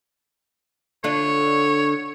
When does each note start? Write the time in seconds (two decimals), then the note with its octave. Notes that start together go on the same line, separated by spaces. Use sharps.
1.04 D3 D4 F4 C#5